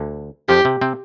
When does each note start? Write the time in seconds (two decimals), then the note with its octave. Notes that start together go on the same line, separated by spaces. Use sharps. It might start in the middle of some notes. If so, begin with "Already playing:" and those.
Already playing: D2 D3
0.49 F2 F3 G4
0.65 C3
0.81 C3 C4